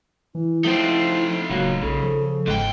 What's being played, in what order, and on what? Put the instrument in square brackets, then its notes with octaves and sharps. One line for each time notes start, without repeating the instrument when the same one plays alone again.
[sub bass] E3 [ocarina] E4
[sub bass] F3 [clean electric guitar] A3 C4 [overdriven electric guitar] D#4 F4
[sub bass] D1 [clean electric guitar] C#2 F#3 A#3
[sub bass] A#1 [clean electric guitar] C#3 [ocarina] A4
[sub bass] F3
[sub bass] G1 [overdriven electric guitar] C#2 G5 [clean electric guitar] G#2